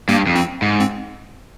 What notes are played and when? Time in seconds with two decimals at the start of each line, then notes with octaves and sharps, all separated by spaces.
0.09 G2 A#3
0.26 F2
0.36 C4
0.62 G#2
0.80 C4